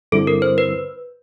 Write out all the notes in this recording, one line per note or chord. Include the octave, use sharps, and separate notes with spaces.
G2 D3 G3 C4 E4 A4
A#4
C5
B4